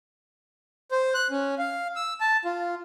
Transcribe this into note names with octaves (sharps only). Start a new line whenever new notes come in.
C5
F#6
C#4
F5
E6
A5
F4